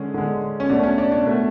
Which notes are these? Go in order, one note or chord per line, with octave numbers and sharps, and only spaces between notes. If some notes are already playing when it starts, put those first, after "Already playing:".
Already playing: D3 G#3 C#4
D3 G#3
C#4
B2 A3 D4
C#4
D4
D4
B2 A3